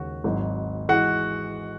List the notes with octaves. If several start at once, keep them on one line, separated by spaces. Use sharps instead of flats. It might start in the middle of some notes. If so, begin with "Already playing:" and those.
Already playing: D#2 C#3 G#3 F#4
G#1 G#2 F#3
E3 G#3 F#4 F#5